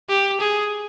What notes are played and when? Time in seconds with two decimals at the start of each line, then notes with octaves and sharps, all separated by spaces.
0.09 G4
0.41 G#4